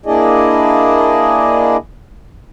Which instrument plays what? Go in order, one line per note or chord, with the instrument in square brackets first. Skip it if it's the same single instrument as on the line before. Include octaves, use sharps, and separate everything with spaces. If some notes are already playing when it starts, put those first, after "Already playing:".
[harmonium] A#3 D4 E4 G#4 D5 D#5